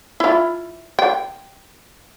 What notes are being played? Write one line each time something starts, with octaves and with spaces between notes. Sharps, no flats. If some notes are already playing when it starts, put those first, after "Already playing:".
E4 F4
G5